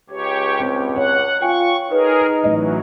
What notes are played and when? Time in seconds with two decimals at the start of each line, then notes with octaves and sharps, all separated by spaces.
0.10 C#2 G4 C#5
0.60 C4
0.96 C#5 F#5
1.42 F4 G5 G#5 C#6
1.91 D#4 G#4 A#4 B4
2.44 A1 E3 F#3 D#5